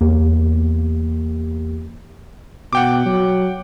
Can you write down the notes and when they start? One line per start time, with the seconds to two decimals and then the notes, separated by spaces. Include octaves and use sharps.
0.01 E2 A#3 G4
2.73 B2 F#5 G5 D6
3.06 F#3